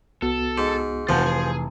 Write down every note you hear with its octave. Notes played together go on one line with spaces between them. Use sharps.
C2 B3 F#4 A4
G#2
F1 E3 F3 F4 F#4 C5 G6
G#4